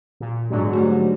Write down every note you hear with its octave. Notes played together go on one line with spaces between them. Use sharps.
A#2
G#2 D3 F#3
G3 A3 F#4